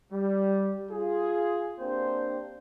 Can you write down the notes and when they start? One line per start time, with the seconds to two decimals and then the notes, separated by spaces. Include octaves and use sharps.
0.12 G3
0.91 F4 G#4
1.80 A#3 C4 D4 G4 C5